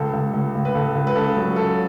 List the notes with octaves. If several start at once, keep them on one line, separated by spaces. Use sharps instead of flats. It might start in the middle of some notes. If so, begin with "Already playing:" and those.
Already playing: C#2 A4
C#2
C#2
C#2
B4
C#2 A4
C#2
B4
C#3 A4
F#3
C#3 A4